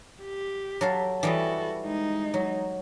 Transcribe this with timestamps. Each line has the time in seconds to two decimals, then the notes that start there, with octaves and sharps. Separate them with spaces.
0.22 G4
0.81 F#3 A4 F5
1.23 E3 G3 F#4 A4 D#5
1.84 G#3 D#4
2.34 F#3